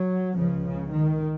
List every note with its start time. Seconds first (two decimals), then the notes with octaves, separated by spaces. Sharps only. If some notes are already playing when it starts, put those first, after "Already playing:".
Already playing: F#3
0.36 C#2 C#3 F3
0.65 C#3
0.94 D#3